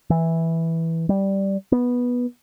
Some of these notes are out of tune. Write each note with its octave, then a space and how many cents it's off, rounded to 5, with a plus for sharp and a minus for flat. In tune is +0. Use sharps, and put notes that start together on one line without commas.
E3 -5
G3 -5
B3 -10